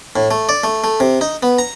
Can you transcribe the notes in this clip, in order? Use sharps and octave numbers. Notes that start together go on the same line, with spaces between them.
A2
A3
D5
A3
A3
C3
D#4
B3
A#5